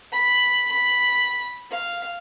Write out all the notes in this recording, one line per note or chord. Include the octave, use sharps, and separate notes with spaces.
B5
B5
F5